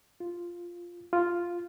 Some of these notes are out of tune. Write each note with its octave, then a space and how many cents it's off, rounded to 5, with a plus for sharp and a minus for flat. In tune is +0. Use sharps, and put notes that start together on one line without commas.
F4 -5
F4 -5